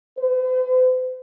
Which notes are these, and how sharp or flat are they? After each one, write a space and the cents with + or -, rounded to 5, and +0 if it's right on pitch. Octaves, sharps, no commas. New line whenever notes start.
C5 -45